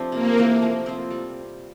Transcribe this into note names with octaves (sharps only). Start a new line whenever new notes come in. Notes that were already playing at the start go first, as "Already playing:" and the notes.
Already playing: F3 A3 C4 D4 G4
C3 A#3
E3 A3
F3
C4 F4
G3